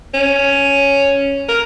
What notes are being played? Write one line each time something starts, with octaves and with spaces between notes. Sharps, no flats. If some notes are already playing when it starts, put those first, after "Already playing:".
C#4
A#4